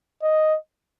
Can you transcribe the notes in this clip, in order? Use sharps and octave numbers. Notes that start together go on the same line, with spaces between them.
D#5